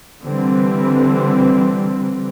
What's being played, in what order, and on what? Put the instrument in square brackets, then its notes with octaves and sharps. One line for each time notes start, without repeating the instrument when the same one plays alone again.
[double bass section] D3 E3 G3 C4